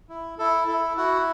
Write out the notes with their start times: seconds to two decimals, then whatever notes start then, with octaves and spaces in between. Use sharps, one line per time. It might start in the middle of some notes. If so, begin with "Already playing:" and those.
0.09 E4
0.38 E4 A4
0.68 E4 A4
0.97 E4 F#4 F#5